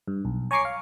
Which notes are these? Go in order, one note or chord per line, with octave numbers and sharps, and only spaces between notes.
G2
B1
C#5 G#5 A#5 C#6 D6 C7
F5